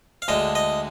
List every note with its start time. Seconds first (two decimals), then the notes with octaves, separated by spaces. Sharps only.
0.22 F5
0.28 D2 D3 G#3 D#5
0.55 D#5